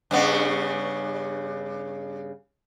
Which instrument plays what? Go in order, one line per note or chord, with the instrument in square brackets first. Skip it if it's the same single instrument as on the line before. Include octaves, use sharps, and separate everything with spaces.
[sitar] G2 C#3 B3